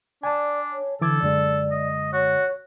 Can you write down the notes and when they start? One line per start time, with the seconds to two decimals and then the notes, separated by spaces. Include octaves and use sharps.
0.23 D4 D5 G#5 A5
0.72 C#5
1.02 D3 E3 A4 D6 G#6
1.22 F#2 D3 G#3 D5
1.71 D#5
2.13 F#4 C#5